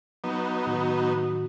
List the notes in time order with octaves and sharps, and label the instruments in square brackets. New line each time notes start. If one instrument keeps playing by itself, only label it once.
[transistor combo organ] F#3 B3 D#4
[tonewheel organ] A2 D#3 F#4